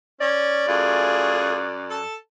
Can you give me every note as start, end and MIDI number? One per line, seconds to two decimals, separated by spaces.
0.21 0.67 61
0.21 2.05 74
0.68 2.01 42
0.68 1.60 57
0.68 1.60 65
0.68 1.60 68
1.90 2.15 69
1.90 2.15 81